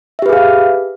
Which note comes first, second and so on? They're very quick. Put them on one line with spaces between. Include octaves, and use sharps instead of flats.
E5 G4 B4 G#4 F5